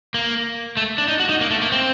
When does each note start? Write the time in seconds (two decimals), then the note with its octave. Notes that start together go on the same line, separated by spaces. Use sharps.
0.14 A#3
0.77 A3
0.98 D4
1.08 D#4
1.20 F#4
1.29 D#4
1.41 A#3
1.51 A3
1.62 A#3
1.72 C4